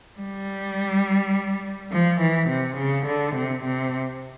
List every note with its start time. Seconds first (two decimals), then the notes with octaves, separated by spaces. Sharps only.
0.19 G3
1.92 F3
2.21 E3
2.49 C3
2.78 C#3
3.06 D3
3.35 C3
3.64 C3